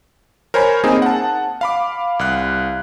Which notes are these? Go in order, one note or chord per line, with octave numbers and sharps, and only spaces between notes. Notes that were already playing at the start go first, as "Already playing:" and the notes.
A#4 C5 C#5 G#5 B5
A#3 C4 D#4 G#4
F#5 A5
F5 B5 D6
C2 F5 F#6